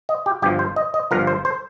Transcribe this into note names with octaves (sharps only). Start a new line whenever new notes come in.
D#5
G4
G1 G2 F3 G4
C5
D#5
D#5
G1 G2 F3 A#4
C5
C5